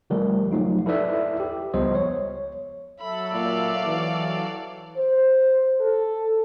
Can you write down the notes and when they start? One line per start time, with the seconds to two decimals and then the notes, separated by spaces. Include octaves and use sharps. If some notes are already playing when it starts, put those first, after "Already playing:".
0.10 D3 F3 G3 A3 A#4
0.52 F3 F#3 A3 D#4 F4
0.86 E4 A4 B4 D5 E5
1.40 G4
1.74 C#2 F3 G3 B3 C5 D#5
1.95 C#5
3.00 F#3 A4 E5 B5
3.33 A#2 D5 F5
3.86 E3
4.97 C5
5.81 A4